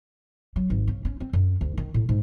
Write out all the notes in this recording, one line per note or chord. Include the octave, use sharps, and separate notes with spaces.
F#3
G#1
C#3
C#4
C4
F#2
D2
D#3
A2
G#2